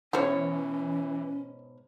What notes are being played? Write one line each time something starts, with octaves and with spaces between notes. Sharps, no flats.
G#2 B2 E3 C#4 E4 G4 C5 C#5